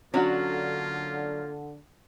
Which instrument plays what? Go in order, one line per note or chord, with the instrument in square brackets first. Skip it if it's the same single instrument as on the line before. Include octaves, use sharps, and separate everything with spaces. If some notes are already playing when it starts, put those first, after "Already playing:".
[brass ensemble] D3 [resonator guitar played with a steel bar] F#3 [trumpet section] A#3 F4 [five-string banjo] C#4 D4 F#4